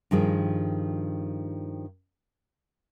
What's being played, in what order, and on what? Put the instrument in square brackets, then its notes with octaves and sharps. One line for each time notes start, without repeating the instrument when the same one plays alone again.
[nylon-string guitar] G2 D#3 F3 G#4